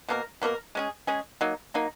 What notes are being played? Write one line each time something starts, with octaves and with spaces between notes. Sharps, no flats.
B2 A#3 D#4 A#4
B2 A#3 D#4 A#4
G#3 C#4 G#4
G#3 C#4 G#4
F#3 A#3 D#4
F#3 A#3 D#4